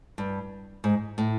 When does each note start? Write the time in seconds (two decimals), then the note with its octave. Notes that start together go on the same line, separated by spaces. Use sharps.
0.18 G2
0.84 G#2
1.18 A2